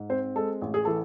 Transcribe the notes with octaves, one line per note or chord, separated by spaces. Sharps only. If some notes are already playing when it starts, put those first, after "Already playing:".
Already playing: G#2
C4 C5
G#3 A4
A1
G#4
E3 A4